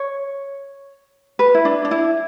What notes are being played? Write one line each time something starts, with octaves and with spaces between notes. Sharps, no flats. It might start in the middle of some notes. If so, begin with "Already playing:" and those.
Already playing: C#5
B4
E4
D4
D4
E4